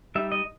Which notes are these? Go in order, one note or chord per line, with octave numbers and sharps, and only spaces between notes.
G3 D#4 E5
D#5